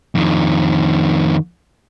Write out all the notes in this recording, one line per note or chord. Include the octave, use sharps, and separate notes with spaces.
F2 D#3